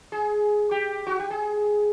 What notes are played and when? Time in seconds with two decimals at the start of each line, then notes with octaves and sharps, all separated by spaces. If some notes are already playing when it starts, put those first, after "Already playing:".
0.12 G#4
0.71 G4
1.07 F#4
1.20 G4
1.31 G#4